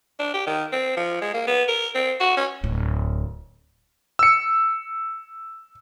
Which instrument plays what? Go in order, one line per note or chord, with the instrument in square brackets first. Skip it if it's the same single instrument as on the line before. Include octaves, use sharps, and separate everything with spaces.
[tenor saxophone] D4
G4
D#3
C4
F3
G#3
A#3
B3
A#4
C4
F#4
C#4
[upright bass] D1 A2
[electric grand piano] E6 C#7